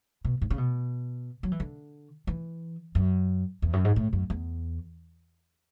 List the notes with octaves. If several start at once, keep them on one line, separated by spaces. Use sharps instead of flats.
B2
G#2
C#3
B2
F#3
E3
D3
E3
F#2
E2
F#2
G#2
A2
F#2
E2